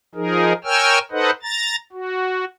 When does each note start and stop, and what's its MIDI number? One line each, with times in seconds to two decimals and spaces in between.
0.15 0.53 53
0.15 0.53 63
0.15 0.53 68
0.15 0.53 70
0.65 0.99 70
0.65 0.99 73
0.65 0.99 79
0.65 0.99 80
0.65 0.99 88
0.65 0.99 89
1.12 1.31 63
1.12 1.31 69
1.12 1.31 71
1.12 1.31 72
1.12 1.31 75
1.12 1.31 78
1.43 1.76 82
1.43 1.76 93
1.93 2.45 66